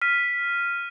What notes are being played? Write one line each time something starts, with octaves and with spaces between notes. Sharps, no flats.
F6 B6 D#7